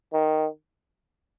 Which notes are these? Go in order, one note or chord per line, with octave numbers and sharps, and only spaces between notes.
D#3